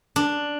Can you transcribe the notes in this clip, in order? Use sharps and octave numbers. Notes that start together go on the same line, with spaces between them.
D4